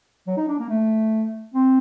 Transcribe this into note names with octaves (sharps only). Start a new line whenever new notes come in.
F#3
D#4
D4
A#3
A3
C4